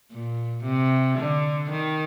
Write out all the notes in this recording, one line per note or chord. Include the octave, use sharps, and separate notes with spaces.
A#2
C3
D3
D#3